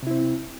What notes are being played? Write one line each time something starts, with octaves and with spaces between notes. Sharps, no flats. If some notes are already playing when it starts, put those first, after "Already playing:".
C3 C4 E4